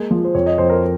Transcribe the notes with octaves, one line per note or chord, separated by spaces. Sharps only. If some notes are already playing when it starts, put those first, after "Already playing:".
Already playing: G#3 A#3
F3
C5
F2 C#5
D#5
F2 C5
A#4